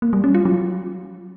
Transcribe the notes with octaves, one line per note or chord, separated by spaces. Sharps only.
A#3
G3
C#4
F4
F#3